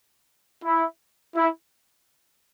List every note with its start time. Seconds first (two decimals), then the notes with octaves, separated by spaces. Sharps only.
0.63 E4
1.36 E4